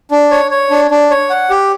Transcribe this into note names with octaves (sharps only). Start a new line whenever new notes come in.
D4
C#5
C#5
D4
D4
C#5
F#5
G4